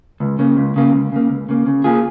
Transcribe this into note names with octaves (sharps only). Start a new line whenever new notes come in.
C#2
C#3 A#3
C#2
C#3 A#3
C#2
C#3 A#3
C#2
C#3 A#3
C#3
A#3 F4 G#4